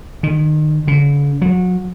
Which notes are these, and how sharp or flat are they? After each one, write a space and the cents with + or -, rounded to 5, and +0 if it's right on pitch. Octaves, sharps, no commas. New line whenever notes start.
D#3 -30
D3 -45
F#3 -30